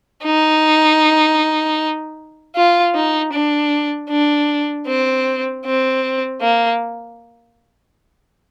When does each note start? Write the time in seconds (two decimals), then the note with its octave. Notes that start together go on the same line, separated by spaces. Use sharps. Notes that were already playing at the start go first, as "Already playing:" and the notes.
0.24 D#4
2.56 F4
2.95 D#4
3.33 D4
4.10 D4
4.87 C4
5.66 C4
6.42 A#3